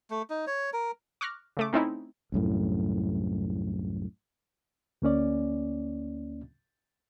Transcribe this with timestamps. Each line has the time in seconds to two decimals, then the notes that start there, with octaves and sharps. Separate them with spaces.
0.10 A3
0.30 D#4
0.47 C#5
0.73 A#4
1.21 C#6 D6 F6 F#6 A#6
1.57 C#3 A3 D6
1.73 A3 C4 C#4 D#4 E4
2.32 C2 F#2 A2
5.02 D2 A#3 C#4 D5